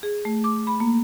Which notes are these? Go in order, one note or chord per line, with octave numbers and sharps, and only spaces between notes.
G#4
A3
D6
B5
A#3